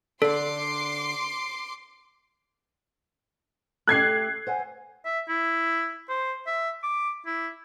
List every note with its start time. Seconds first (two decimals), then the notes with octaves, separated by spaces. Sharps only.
0.22 D3 D4 A4 C6 D6 C7
3.87 A3 G4 F#6 G#6 C7
4.47 C5 F#5 G#5
5.05 E5
5.28 E4
6.09 C5
6.47 E5
6.83 D6
7.26 E4